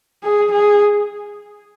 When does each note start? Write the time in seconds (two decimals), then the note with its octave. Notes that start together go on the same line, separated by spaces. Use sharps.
0.23 G#4
0.51 G#4